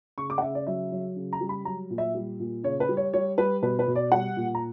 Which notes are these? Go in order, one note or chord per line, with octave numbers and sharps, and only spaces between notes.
C#3 C#6
D6
F#5
C#3 E5
D5
F#3 E5
F#3
C#3
A#5
G3
B5
F#3 A#5
A#2
E5
G3
A#2
C#3 C#5
B4
G3
C#5
G3 C#5
G3 B4
B2 B4
B4
B2
D5
G3 F#5
A#2
A#5